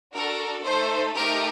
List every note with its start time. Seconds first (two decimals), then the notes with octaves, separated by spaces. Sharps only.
0.15 D4 F#4 A4 A#4
0.66 A3 D#4 A4 C5
1.16 A3 D#4 G4 A#4